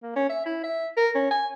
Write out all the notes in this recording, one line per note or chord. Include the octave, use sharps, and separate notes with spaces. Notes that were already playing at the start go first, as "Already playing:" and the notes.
A#3
C#4
E5
E4
E5
A#4
C#4
G#5